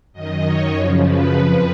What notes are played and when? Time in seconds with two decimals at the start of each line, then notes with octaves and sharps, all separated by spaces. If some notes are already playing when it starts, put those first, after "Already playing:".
0.13 F#2 D#3 D#5
0.44 C#5
0.75 F#2 C#3 F3
1.06 B4
1.36 F2 F3 B4